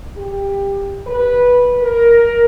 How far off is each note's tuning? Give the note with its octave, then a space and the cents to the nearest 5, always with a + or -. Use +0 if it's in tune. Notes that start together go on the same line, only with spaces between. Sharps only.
G4 +20
B4 -10
A#4 +10